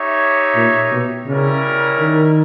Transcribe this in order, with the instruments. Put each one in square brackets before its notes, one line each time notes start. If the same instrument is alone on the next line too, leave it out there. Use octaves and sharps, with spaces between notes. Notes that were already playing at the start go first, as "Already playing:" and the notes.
Already playing: [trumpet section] D#4 G4 C#5 E5
[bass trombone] A#2
B2
[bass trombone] C#3 [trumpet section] G3 C#4 E4 A#4
[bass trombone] D#3